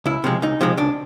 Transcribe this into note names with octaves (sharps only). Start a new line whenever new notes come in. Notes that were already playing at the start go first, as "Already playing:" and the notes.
C#2 E4
C3 F3 G#3
C#2 D#4
C3 F3 G#3
C#2 D4